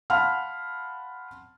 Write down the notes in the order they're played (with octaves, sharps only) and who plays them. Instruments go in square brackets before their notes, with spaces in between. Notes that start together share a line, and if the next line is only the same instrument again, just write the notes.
[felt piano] F5 F#5 A5 B5 C6 F6